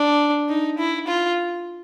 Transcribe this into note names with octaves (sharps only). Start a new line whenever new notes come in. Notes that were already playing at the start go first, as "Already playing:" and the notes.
Already playing: D4
D#4
E4
F4